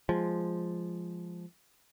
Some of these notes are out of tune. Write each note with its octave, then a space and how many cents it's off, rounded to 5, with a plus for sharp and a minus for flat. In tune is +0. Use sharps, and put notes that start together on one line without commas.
F3 +0 G#3 +0